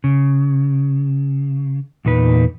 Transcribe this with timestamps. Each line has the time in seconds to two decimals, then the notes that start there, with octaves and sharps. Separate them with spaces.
0.04 C#3
2.05 E2 A#2 D#4 B4